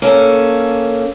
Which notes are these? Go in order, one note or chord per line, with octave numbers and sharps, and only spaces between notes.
A#3 C#4 A4